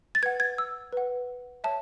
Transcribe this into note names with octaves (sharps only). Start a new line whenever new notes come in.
A6
B4 F#5 G#6
G#6
E6
B4 F#5
C#5 E5 A5